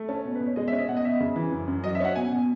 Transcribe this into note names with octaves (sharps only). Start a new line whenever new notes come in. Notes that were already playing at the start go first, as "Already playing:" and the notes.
Already playing: A3
C#4 A5
B2
B4
B2
C#5
G#3 D#5
E5
C#4
D#5
B2 F#5
D#5
B2 E5
C#3
E3
F#2
F#2
F#3 D#5
E5
C#4 F#5
B2 G#5
B2